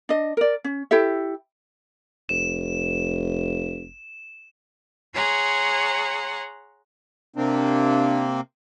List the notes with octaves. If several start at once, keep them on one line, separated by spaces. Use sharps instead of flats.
D4 D#5
A#4 D5
C#4
E4 G4 A4 E5
F1 E7
G#4 C#5 F#5 A#5 C6
C3 A#3 C4 D4